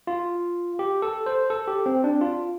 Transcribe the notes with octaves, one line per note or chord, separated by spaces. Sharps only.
F4
G4
A4
C5
A4
G4
C4
D4
F4